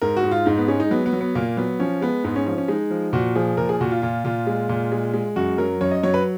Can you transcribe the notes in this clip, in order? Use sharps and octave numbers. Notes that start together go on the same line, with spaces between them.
G#2 A#4
F#4
G#2
F4
G#2 D#4
B3
G#3 C#4
D#4
F#3 B3
B3
F#3
B3
A#2 A#3
F#3 B3
F3 C#4
G#3 B3
G#2 B3
C#4
F3 C#4
C#4
G#3 D#4
F3
A#2 F#4
F3 G#4
A#2 A#4
G#4
A#2 F#4
F4
A#2 F4
A#2 F4
G#3
A#2
G#3
G#3
F#2 F#4
F#3 A#4
F#2 C#5
D#5
F#3 C#5
B4